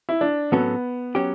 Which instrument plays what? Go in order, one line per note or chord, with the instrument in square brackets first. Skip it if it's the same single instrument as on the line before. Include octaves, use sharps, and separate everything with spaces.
[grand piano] E4
D4
[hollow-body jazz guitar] A2 F#3 C#4 F#4 A4 [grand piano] B3
[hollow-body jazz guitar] F#3 C#4 G4